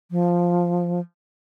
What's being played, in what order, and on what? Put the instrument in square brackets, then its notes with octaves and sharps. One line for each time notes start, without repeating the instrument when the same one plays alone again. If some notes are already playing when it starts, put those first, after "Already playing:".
[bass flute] F3